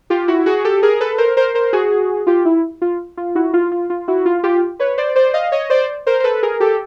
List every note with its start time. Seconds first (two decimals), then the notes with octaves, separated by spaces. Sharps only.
0.10 F4 G4
0.28 E4 F#4
0.46 F#4 G#4
0.64 G4 A4
0.82 G#4 A#4
1.01 A4 B4
1.18 A#4 C5
1.37 A#4 C5
1.54 A#4 C5
1.73 F#4 G#4
2.27 F4 G4
2.45 E4
2.82 F4
3.17 F4
3.35 E4 F#4
3.54 F4
3.72 F4
3.90 F4
4.08 E4 F#4
4.26 F4
4.44 F4 G4
4.80 B4 C#5
4.98 C5 D5
5.16 C5 D5
5.34 D#5 F5
5.52 C#5 D#5
5.70 C5 D5
6.07 A#4 C5
6.20 C5
6.24 A4 B4
6.43 G#4 A#4
6.60 G4 A4